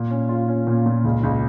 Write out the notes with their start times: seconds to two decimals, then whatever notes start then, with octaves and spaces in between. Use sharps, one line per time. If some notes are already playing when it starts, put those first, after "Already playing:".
Already playing: A#2
0.10 C#4
0.29 F4
0.48 C#4
0.67 A#2
0.86 A#2
1.04 C#2
1.23 C#2